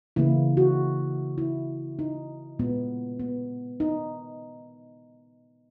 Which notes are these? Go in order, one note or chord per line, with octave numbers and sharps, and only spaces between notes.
C#3 E3 A#3 E4
F#4
E4
D#4
A#2 G#3 B3
B3
D#4